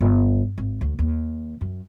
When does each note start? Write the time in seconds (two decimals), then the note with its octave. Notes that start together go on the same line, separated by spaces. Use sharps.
0.01 G1
0.58 G#1
0.81 D2
0.99 D#2
1.61 F#2